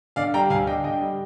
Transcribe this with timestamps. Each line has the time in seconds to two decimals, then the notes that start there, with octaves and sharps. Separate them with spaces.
0.16 D3 D5 F5
0.34 G3 G5 A#5
0.50 D2 F5 G#5
0.67 D4 D#5 G5
0.84 D3 D#5 G5
1.01 G3